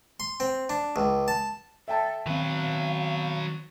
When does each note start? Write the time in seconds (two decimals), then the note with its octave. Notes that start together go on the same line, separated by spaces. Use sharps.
0.20 C6
0.40 C4
0.70 D4
0.96 C#2
1.28 A5
1.88 A4 E5 G5 A5
2.26 D#3 F#3 C4 B4 F5